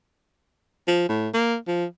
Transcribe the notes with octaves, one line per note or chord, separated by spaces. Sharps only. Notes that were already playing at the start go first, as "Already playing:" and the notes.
F3
A2
A#3
F3